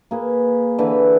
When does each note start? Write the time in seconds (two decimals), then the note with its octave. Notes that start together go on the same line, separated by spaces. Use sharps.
0.11 A#3 G#4 B4
0.79 D3 E3 E4 B5